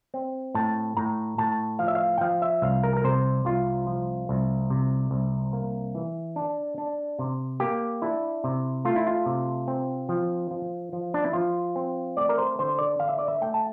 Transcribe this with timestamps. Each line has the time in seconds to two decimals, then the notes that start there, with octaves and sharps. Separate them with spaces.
0.14 C4
0.54 A2 A5
0.97 A2 A#5
1.38 A2 A5
1.79 F3 F5
1.88 E5
1.95 F5
2.18 G5
2.21 F3 F5
2.42 E5
2.62 C2 F5
2.83 A#4
2.97 A#4
3.04 C3 C5
3.45 C2 F4
3.87 F3
4.29 C2
4.70 C3
5.11 C2
5.53 A#3
5.95 E3
6.36 D4
6.78 D4
7.19 C3
7.60 A#3 G4
8.02 D4 E4
8.44 C3
8.85 A3 F4
8.96 E4
9.07 F4
9.26 C3
9.68 C4
10.09 F3
10.51 F3
10.93 F3
11.14 D4
11.24 E4
11.33 F3 F4
11.76 C4
12.17 A3 D5
12.29 A#4
12.38 C5
12.59 D3 C5
12.79 D5
13.00 D3 F5
13.09 E5
13.18 D5
13.28 E5
13.41 A3 G5
13.54 A5